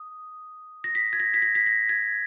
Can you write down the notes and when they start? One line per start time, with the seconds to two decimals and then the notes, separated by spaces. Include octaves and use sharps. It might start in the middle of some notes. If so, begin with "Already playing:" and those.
Already playing: D#6
0.84 A#6
0.95 B6
1.13 G#6
1.20 A#6
1.34 B6
1.42 A#6
1.55 B6
1.66 A#6
1.89 G#6